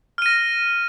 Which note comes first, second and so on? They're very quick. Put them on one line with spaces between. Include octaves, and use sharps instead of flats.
F6 D#7 A#6